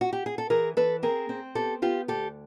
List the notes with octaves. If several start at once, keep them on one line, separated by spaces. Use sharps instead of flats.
F#4
G4
G#4
A4
E3 G#4 A#4
E3 A4 B4
C4 G#4 A#4
C4
B3 G4 A4
B3 F4 G4
D2 G4 A4